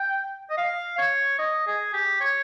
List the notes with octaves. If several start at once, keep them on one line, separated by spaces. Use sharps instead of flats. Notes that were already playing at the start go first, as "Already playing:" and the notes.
Already playing: G5
D#5
F5
C#5
D#5
G#4
G4
C#5